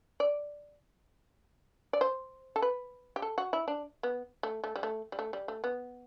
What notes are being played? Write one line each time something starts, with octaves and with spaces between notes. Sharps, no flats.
D5
D5
C5
A4
B4
G4
A4
F#4
E4
D4
B3
A3
A3
G3
A3
G3
A3
G3
A3
B3